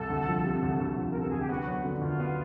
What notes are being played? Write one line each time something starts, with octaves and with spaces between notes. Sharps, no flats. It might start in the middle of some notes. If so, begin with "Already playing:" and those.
Already playing: C2 A4
D2
F3
C3
D2
D2
F3
A#4
C3 A4
D2 G#4
G4
B3 F#4
F#3
D3
F4
D2
B3